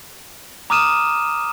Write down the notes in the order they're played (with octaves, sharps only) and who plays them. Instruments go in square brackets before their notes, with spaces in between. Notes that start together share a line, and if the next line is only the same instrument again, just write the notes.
[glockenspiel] A#5 D6 D#6 F6 D#7 E7